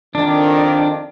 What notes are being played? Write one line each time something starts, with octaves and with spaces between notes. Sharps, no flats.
F2 D#3 D4